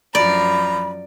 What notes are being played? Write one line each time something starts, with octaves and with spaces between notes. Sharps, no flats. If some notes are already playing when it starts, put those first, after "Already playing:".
F#2 F3 D5 A#5 B5